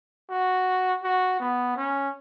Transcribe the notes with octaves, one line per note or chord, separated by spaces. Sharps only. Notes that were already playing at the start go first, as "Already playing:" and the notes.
F#4
F#4
B3
C#4